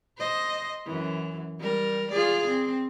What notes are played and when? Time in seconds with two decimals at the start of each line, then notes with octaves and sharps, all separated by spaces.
0.18 C5 D#5
0.86 F#2 E3
1.59 G3 A#4
2.11 F4 G#4 D5
2.47 C4